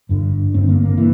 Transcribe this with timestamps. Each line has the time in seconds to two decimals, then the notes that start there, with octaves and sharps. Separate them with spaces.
0.09 G1 G2 D3
0.54 G1 G2 D3 C4
0.69 A#3
0.83 A#3
0.98 D3 E3